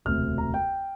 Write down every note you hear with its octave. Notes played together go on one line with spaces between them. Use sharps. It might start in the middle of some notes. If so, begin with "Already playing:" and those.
E1 D2 C3 F6
A#5
G5